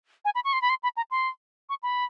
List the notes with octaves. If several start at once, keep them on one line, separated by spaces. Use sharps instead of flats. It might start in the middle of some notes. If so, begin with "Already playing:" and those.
G#5
B5
C#6
C6
B5
C6
B5
A#5
C6
C#6
B5